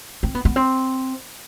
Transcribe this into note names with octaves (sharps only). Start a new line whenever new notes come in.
C4
B3
B3
C4